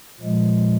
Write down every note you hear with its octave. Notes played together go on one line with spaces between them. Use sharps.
A#2 F3 G#3